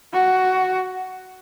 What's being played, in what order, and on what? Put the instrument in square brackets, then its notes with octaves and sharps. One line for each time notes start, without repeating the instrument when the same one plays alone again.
[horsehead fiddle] F#4